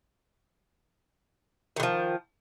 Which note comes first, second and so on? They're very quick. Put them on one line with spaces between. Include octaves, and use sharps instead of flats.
D#3 D3 F3